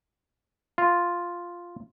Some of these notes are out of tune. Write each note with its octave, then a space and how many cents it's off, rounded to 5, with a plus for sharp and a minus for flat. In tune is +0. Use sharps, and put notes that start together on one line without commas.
F4 +0